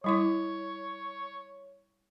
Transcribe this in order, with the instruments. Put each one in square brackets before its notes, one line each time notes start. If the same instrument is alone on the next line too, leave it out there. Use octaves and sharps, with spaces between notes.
[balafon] G3 E4 D6 [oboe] C#5